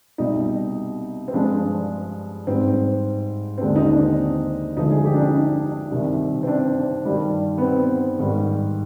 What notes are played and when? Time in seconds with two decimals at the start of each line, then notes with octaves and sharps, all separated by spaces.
0.18 C2 B2 G3 D#4
1.28 C4
1.33 G2 F3 G#3 D4
2.47 G#2 G3 C4
3.58 C4
3.61 D#2 D3 G#3 D4
3.76 D#4
3.90 D4
4.05 C4
4.77 D2 D3 F3 G#3 D#4
4.91 G#4
5.05 G4
5.14 D4
5.19 D#4
5.34 D#4
5.91 C2 C3 D#3 G3
6.43 C4
6.47 D4
7.05 G2 D#3 G3
7.58 B3
7.62 C4
8.19 G#2 D#3 G3